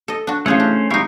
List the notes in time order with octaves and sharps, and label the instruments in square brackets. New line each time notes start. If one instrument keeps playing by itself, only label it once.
[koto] A4 D#5
D4 F#4
[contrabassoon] A1 [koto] C#3 G#4 F#5 [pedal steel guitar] A3 C#4 C5
[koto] D4
[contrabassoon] G#1 [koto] D#4 E4 [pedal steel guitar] G4 F5 C#6